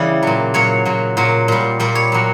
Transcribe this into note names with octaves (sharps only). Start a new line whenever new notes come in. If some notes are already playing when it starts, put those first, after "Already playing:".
Already playing: C#3 E3 G3 D5
A#2 F#3
A#2 F#3 C#5
A#2 F#3
A#2 F#3
A#2 G3
A#2 G3 D5
C#5
A#2 F#3